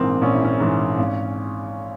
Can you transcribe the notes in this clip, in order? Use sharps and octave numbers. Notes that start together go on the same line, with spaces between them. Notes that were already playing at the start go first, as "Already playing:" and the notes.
Already playing: A#1 G#2 E3 A#3 C4
A#1 C#4
E4
C#4
G#2 E3
G#1